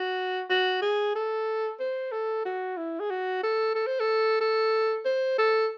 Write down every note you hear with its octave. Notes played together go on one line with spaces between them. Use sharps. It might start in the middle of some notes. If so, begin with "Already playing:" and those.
Already playing: F#4
F#4
G#4
A4
C5
A4
F#4
E4
G#4
F#4
A4
A4
C5
A4
A4
C5
A4